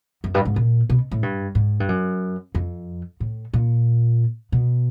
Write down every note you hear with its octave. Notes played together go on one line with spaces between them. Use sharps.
F#2
G2
G#2
A#2
B2
A2
G2
G#2
G2
F#2
F2
A2
A#2
B2